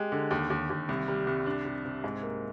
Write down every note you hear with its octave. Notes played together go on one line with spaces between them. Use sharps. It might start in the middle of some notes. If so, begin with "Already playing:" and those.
Already playing: G#3 G4
D3
D#2
D#2
D#2
C2
G3
C2
D4
C3
C3
G#2
A#3